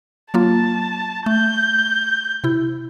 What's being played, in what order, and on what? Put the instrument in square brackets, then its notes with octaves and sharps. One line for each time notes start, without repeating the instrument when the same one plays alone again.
[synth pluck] F#3 A#3 F4 [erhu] A5
[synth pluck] A3 [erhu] G6
[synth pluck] C3 E4